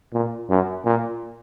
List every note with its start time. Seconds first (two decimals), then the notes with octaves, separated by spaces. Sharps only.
0.14 A#2
0.50 F#2
0.85 A#2